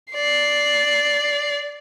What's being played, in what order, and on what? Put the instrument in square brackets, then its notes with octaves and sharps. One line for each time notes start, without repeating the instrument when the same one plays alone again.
[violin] D5 C7